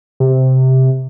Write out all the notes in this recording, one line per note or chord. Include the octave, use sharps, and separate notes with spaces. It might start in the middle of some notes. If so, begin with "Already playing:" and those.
C3